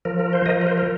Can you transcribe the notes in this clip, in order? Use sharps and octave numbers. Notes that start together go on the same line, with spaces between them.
F3 A#4
A#4
C5
F3 A#4 D#5
A#4
C5
A#4